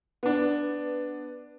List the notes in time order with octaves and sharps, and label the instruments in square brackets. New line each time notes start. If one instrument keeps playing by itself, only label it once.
[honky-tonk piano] B3 D4